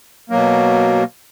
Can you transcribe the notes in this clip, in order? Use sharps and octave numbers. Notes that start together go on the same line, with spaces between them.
B2 F#3 A#3